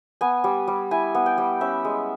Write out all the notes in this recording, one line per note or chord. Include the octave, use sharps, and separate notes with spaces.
B3 G#5
G3
G3
E4 G#5
B3
G5
G3
C#4 E5
G#3